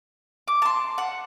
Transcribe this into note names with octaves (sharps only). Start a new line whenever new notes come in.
D6
A5 C6
F#5